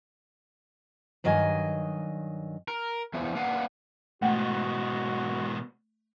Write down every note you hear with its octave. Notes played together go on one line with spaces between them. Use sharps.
G2 D#3 F#3 D#5 G#5
A#4
E2 E3 F3
A#3 D4 B4 F5 F#5
G#2 B2 A3 F#4 F#5 G5